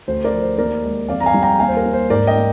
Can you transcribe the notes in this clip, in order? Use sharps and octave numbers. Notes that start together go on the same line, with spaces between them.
D2 C5
A#4 D5
F3
C5
D#2 A#4 D5
G#3
F2 D5 F5
A#5
F5 G#5
G3
G5 A#5
D#2 F5 G#5
C5
A#4
A#3
C5
G#2 A#4 D5
D#5 G5
A#3